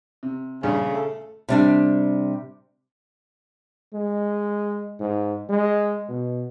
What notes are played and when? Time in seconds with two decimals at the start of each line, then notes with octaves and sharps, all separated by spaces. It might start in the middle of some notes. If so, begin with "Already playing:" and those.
0.23 C3
0.63 A#1 G2 C#3
0.91 A3 A4
1.49 C3 G3 D4
3.93 G#3
5.00 G#2
5.50 G#3
6.09 B2